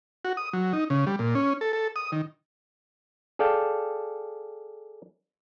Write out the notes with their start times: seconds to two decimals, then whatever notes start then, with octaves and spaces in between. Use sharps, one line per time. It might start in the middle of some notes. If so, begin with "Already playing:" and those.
0.25 F#4
0.37 D#6
0.53 F#3
0.73 D#4
0.90 C#3
1.07 G3
1.19 A#2
1.35 C#4
1.61 A4
1.73 A4
1.96 D#6
2.12 D#3
3.39 G#4 A4 D5 F5 G5 A5